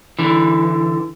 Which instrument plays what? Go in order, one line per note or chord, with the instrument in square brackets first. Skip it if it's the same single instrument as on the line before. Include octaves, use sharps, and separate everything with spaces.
[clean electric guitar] D3 E3